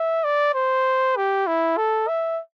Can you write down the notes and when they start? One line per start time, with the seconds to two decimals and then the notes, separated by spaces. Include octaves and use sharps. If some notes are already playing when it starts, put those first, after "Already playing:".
Already playing: E5
0.24 D5
0.54 C5
1.17 G4
1.47 E4
1.77 A4
2.08 E5